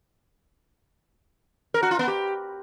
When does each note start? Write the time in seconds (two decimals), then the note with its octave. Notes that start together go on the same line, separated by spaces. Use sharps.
1.74 A#4
1.83 F#4
1.91 F4
1.99 B3
2.08 G4